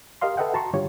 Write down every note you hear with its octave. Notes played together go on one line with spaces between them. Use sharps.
G4 A#4 D#5 F5 C6
A4 B4 D#5 E5 F#5 G5
F#4 A5 A#5 C6 C#6
G2 D3 F4 G4 C#5